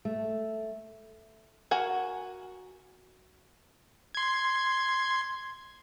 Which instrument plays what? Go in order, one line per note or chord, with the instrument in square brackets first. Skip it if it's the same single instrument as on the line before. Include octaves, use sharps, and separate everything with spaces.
[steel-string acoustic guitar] A3
[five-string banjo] F#4 A#4 G#5
[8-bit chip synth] C6 G#6